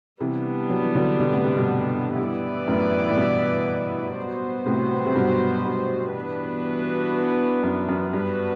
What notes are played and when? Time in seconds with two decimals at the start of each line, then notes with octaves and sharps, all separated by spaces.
0.20 C3 E3 G3 B3 D4
0.70 F#3
0.82 E3
0.95 D3 F#3
1.19 B2 D3
1.32 A2 C3
1.44 A2 C3
1.56 G2 B2
2.18 G2 E3 B3 E4 B4 D5
2.68 F#2 A2
3.10 A2
3.17 G2 B2
4.17 F#3 B3 F#4 C5
4.66 A2 C3
5.06 C3
5.16 G2 B2
5.65 G2
6.15 E3 B3 D4 F#4 B4
7.63 F#2
7.89 F#2
8.13 G2 G3 B3 D4 F#4 B4